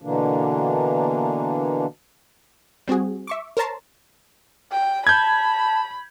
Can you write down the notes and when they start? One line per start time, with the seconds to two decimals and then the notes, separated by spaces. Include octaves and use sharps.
0.02 B2 D3 E3 A#3 D4
2.87 G3 C4 F#4 G#4
3.27 E5 C#6 D6
3.57 A#4 C5 C#5 A5 A#5 C6
4.72 G5
5.07 A5 B5 G6 G#6